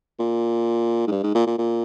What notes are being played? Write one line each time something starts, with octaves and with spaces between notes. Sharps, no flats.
A#2
G#2
G2
G#2
A#2
A#2
A#2